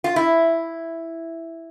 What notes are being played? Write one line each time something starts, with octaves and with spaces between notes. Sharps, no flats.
F4
E4